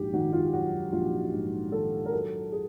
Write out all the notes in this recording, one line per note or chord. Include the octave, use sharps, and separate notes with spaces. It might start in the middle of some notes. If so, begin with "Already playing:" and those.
Already playing: A#1 G#2 F#4 G4
D#3 F#4
F4
F#3 F#4
A#1 F4
G#2
D#3 A4
A#4
F#3 A4
G#4